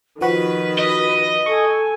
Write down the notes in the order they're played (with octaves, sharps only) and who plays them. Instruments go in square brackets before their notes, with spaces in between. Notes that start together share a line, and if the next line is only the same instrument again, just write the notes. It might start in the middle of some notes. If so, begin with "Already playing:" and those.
[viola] D#3 [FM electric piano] F3 F#4 [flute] B4
[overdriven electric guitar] D#5
[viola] A4 G#5 [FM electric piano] C#6